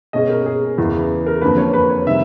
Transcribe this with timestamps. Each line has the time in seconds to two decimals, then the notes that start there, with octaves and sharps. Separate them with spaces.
0.13 B2 G#3 C#4 D#5
0.30 A#4
0.46 G#4
0.78 E2 C#3 E3
1.27 A#4
1.42 F2 D3 F3 A#3 B4
1.57 C#5
1.74 B4
1.90 C#5
2.07 C3 D#3 G3 E5